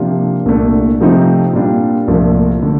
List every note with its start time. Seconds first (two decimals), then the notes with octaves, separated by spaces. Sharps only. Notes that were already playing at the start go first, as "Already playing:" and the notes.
Already playing: C3 F3 A#3 D4 F4
0.46 C2 A#2 A3 D4
1.01 C3 F3 A3 C4 D#4
1.53 A#2 G3 D4 F4
2.08 C2 A#2 F3 A3
2.62 D3 A3